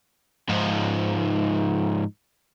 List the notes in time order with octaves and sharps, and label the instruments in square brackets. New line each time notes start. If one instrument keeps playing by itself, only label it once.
[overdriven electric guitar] G#2 F3